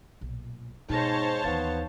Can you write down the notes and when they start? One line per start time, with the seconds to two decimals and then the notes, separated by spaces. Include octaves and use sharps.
0.21 B1 A#2
0.90 G#2 B2 D#4 C5 C#5 A5 A#6
1.44 D#2 E3 B3 D#4 F5 A6